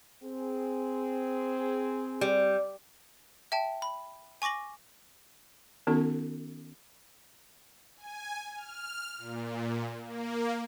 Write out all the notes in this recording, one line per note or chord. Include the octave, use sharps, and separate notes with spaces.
C4 G#4
G3
E5 G5 A5
B5
G#5 C#6 D6 A#6 F#7
D#3 B3 C#4 D#4 F#4 A4
G#5
F6
A#2
A#3